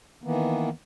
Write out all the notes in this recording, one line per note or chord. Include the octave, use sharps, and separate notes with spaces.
D#3 E3 A#3 B3